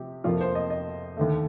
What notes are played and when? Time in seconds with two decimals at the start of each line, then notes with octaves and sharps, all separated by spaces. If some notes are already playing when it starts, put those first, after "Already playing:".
Already playing: C3 F3 G4
0.24 F2 C3 F3 A#3 F4
0.41 C5
0.55 D#5
0.70 D#5
1.17 D#2 D3 A3